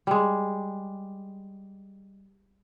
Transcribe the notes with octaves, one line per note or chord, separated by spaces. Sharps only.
G3 G#3